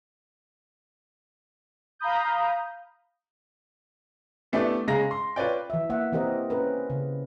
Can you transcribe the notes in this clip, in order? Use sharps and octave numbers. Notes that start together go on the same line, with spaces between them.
F5 A#5 B5 D#6 G6
E3 A3 B3 D4 G4 D5
C#3 G#3 F5 A#5 A#6
C6
F4 B4 C#5 D5 G5
E3 E5
A#3 E5 F#5
E3 C4 G4 A#4 D#5
C#4 A#4 B4
C#3